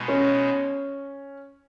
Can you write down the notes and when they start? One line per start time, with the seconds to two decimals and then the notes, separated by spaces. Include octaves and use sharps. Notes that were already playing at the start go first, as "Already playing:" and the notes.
Already playing: B2 G#3 D#4 F#4
0.08 C#4